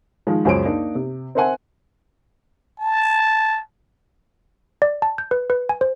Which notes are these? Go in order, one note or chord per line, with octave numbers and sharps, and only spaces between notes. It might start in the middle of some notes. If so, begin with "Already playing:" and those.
D#3 F3 G#3
C#2 F#2 G#4 C5 C#5 D7
A#3 D4 D#4
C3
C4 A#4 C5 E5 F#5 G#5
A5
D5
A5
G6
B4
B4
G#5
C5